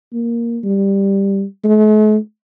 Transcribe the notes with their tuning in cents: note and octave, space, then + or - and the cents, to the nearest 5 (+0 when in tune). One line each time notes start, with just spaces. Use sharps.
A#3 +5
G3 +5
A3 -45